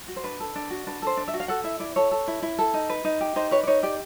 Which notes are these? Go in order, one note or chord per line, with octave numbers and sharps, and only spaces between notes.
F#4
C5
D4 B4
A4
D4
F#4
D4 B4
A4 C5
D4
E5
F#4
F5
A4 F#5
E4 E5
E4 D5
A4 C#5
A4
E4
E4
A4
D#4
B4
D#4
G4
D#4 C5
B4 C#5
D5
D#4 C#5
G4 D5